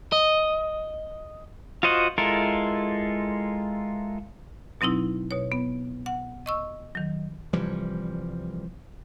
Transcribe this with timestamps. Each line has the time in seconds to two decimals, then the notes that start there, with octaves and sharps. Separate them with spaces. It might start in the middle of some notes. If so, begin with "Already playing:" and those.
0.12 D#5
1.83 F4 F#4 C5 D#5 F#5
2.18 G#3 E4 F4 A4 A#4
4.81 B2 F#3 C4 D#4 E4
5.31 B2 C#5
5.52 B3
6.06 F#5
6.46 D#5 C#6 E6
6.95 D#3 F#3
7.53 C2 E3 F3 G3